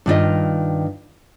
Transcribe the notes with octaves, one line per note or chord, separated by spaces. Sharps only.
G2 D#3 F4 D#5